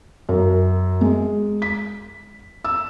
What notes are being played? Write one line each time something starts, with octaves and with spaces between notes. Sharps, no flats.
F#2
G#3
B6
E6